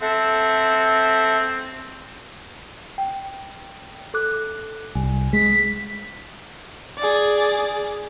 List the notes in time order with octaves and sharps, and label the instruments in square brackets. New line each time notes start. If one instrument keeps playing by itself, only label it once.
[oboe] C4 [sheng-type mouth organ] A4 E5 F#5
[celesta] G5
A4 D6 F#6
[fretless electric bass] C2 [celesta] G#5
[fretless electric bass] G#3 [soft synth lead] B6
[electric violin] G#4 D5